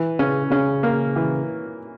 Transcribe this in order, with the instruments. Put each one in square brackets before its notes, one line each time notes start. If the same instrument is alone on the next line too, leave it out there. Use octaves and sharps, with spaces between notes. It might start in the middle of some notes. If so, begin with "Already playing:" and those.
Already playing: [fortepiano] E3
[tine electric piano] C#3 [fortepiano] C#4
[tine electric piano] C#3 [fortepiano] C#4
[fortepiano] A#3
E3